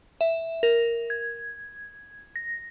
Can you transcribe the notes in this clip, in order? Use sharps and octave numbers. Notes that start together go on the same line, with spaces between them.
E5
A#4
G#6
A#6